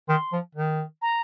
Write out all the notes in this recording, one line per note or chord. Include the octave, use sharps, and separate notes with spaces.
D#3 C6
F3
D#3
A#5